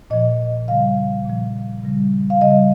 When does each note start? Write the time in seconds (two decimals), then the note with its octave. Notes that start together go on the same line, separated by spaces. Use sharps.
0.10 A#2 F3 D#5
0.68 C#3 G3 F5
1.25 A#2 F3
1.84 C#3 G3
2.30 F5
2.41 C#3 G3 D#5